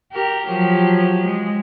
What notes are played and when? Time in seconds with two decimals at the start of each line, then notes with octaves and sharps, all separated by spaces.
0.12 G4 A#4
0.46 F3 F#3 G4
1.25 G#3